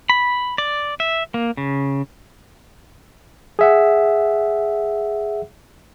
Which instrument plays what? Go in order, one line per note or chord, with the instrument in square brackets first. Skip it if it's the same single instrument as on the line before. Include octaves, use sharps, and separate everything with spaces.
[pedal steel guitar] B5
D5
E5
A#3
C#3
[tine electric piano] G#4 E5 F#5